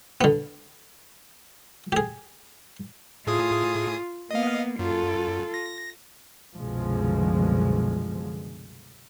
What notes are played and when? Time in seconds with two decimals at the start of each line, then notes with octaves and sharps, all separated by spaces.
0.21 D3 B3
1.92 G4 G#4
3.27 A2 F4 G#4 D#6
4.31 A#3 B3 D#5 F5
4.79 F#2 F4 A4
5.54 A#6
6.56 C2 F#2 B2 D3 F3 G#3